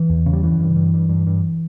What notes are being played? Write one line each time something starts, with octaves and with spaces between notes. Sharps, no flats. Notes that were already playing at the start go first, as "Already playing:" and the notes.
Already playing: E3
E2
C#3
G3
G2 E3
G2
G2
G2
G2
G2